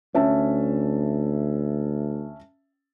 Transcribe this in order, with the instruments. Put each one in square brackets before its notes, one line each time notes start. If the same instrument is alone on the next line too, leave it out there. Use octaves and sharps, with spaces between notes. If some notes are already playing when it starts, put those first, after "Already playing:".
[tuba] D2 [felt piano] C#4 E5 A5